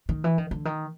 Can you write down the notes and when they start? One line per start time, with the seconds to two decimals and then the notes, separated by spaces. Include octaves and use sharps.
0.09 D#3
0.24 E3
0.38 D#3
0.51 D3
0.65 D#3